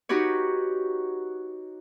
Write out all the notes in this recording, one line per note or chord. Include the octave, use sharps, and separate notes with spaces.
D#4 F#4 G4 B4 C#5